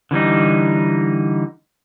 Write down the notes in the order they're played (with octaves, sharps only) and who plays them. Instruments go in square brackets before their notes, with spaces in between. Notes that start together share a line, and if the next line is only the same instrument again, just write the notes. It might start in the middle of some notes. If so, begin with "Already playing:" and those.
[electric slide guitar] D3 E3 G3 D#4